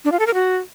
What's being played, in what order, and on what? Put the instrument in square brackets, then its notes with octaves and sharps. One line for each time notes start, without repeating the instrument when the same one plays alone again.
[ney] D4
F4
A4
A#4
F#4